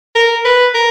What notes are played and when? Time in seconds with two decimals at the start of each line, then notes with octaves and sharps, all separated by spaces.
0.15 A#4
0.45 B4
0.74 A#4